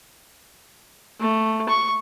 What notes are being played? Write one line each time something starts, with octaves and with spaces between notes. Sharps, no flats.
A3
C#6